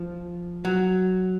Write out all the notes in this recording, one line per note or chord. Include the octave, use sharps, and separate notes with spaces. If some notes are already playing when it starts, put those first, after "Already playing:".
Already playing: F3
F#3